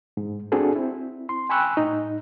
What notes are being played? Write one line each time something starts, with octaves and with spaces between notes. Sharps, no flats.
G#2
C4 D4 F#4 G#4 A4
C4 E4
C6
G5 G#5 B5 C#6 E6 F#6
A2 D#4